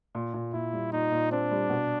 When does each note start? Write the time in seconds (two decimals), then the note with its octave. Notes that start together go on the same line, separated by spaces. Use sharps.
0.15 A#2
0.34 A#2
0.53 A#2 E4
0.73 G3
0.92 A#2 D#4
1.12 A#2
1.31 C4 D4
1.51 G3
1.70 B2